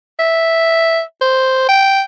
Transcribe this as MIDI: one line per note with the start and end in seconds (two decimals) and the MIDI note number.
0.19 1.01 76
1.21 1.65 72
1.69 2.01 79